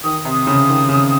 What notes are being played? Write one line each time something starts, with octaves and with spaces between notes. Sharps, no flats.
D#3 D#6
C3
D#6
C#3
D#3
C#3